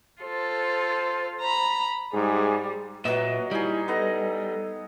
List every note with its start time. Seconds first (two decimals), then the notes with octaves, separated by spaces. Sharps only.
0.22 F4 A4 C5
1.41 A#5 B5
2.13 G#2 G3 G#4
3.05 A#2 F#3 B4 D#5 E5
3.51 G3 D#4 E4 G#4
3.88 B3 A4 D#5 A#5